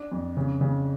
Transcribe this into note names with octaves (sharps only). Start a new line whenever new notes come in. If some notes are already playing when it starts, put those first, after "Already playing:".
Already playing: D4
F2
C#3
C#3